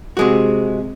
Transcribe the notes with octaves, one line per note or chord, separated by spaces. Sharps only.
C3 G#3 F#4